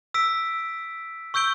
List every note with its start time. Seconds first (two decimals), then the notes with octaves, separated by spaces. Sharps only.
0.14 E6 B6 D7
1.34 C#6 E6 G6 D7 G7